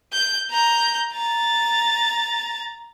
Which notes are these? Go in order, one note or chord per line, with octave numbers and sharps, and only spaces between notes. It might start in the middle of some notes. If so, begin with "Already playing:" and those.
G6
A#5 G6
A#5 A6